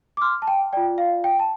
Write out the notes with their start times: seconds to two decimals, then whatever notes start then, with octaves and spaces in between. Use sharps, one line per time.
0.17 D6
0.21 C6 F6
0.42 A5
0.47 G5
0.73 F4 D5 G5
0.98 F5
1.24 G5
1.39 A5